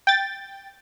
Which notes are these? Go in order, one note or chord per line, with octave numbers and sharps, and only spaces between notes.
G5 A6